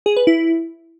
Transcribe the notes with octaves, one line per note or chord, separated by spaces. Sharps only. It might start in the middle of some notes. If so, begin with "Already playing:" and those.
G#4
B4
E4